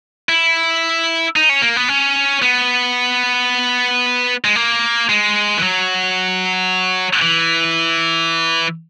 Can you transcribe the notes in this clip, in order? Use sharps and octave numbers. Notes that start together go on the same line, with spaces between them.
E4
D#4
C#4
A#3
B3
C#4
B3
G#3
A#3
G#3
E3
F#3
E3